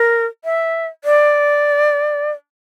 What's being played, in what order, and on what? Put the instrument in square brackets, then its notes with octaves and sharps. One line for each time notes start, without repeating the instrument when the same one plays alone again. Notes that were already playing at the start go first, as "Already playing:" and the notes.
Already playing: [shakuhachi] A#4
E5
D5